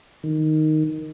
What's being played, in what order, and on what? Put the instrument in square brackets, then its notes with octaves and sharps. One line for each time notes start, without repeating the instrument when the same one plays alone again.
[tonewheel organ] D#3